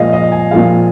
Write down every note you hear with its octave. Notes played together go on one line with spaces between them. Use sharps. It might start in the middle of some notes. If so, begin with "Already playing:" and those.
Already playing: A#2 F3 G#3 D#5 F5
D#5
G#5
A#2 F3 G#3 F5